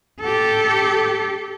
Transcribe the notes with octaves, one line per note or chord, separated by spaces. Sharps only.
G4 A4